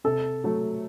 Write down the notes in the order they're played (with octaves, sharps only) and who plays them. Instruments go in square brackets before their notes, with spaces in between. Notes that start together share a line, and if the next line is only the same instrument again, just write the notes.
[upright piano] C3 [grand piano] A4
[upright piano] F#3 A3